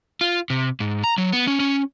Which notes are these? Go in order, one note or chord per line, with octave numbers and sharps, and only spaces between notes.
F4
C3
G#2
A#5
F#3
B3
C#4
C#4